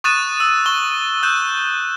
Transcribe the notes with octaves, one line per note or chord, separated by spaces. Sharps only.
C#6 D#6 F#6 A6 D#7 E7
E6 E7
C#6 G7
E6 F#6 G6 E7